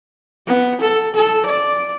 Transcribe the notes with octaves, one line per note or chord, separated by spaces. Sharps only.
B3
A4
A4
D5